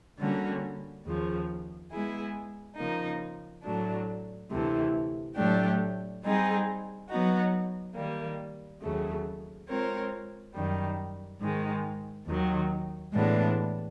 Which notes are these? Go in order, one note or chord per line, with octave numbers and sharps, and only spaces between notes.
D3 G3 A#3 C#4 F#4
D#2 C#3 F3
G#3 B3 E4 G#4
C#3 F3 A#3 D#4
A2 F#3 A3 D4
D2 C3 E3 A3
A2 F#3 A3 D4 G4
G3 C4 D#4 G#4
F#3 B3 D#4 F#4
D#3 G3 A#3
D#2 C#3 F#3 A3
G#3 C4 F4 A#4 C#5
F#2 D#3 G3
G#2 D#3 G#3
D#2 D#3 F#3
A2 E3 G#3 B3 D4